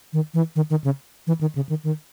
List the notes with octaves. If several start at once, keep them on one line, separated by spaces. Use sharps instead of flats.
D#3
E3
D#3
D#3
C#3
E3
D#3
C#3
D#3
D#3